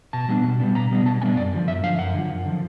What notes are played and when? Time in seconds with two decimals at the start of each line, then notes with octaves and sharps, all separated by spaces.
0.13 B2 A5
0.29 G3 B3 D4
0.44 B2
0.59 G3 B3 D4
0.75 B2 A#5
0.91 G3 B3 D4
1.05 B2 A5
1.21 G3 B3 D4 G#5
1.37 F#2 D5
1.53 D3 F3
1.68 F#2 E5
1.83 D3 F3 F5
1.99 F#2 F#5
2.14 D3 F3
2.30 F#2
2.45 D3 F3